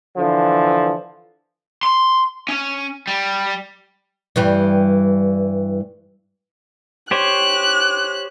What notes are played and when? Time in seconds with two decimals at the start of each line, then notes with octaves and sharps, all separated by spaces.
0.17 D3 E3 F3
1.83 C6
2.49 C#4
3.07 G3
4.36 G2 E3 G3
7.11 G4 C5 C#5 F#6